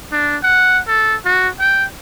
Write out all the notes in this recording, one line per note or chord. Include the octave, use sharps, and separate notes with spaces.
D4
F#5
A4
F#4
G5